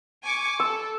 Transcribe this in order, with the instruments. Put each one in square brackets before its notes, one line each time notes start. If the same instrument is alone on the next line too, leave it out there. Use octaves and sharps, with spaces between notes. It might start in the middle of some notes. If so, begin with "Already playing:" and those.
[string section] G#5 C#6 D6
[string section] A4 [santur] E6